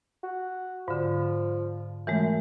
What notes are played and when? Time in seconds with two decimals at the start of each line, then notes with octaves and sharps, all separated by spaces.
0.23 F#4
0.88 G#2 D3 F3
2.07 F#2 E3 G#3 A3